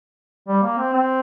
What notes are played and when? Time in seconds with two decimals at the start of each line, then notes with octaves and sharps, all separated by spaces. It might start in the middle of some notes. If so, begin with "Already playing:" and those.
0.48 G3
0.63 A#3
0.78 C4
0.93 C4